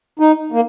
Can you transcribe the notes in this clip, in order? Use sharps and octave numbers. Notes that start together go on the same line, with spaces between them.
D#4
A#3